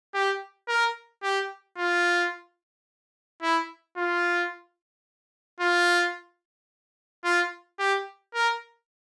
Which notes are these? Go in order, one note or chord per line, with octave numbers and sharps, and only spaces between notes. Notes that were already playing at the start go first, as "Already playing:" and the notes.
G4
A#4
G4
F4
E4
F4
F4
F4
G4
A#4